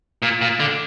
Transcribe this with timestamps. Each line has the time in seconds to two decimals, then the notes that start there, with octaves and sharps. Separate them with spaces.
0.22 A#2
0.41 A#2
0.60 D3